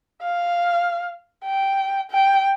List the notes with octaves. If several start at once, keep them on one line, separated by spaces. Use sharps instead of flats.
F5
G5
G5